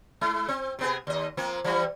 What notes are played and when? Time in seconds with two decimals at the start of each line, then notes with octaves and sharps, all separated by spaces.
0.21 G#3 E4
0.48 C4
0.79 C3 B3 G#4
1.07 D#2 D#5
1.37 F3 A#3 C4
1.64 E3 G3